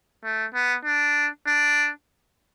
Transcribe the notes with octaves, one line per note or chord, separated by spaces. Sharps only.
A3
B3
D4
D4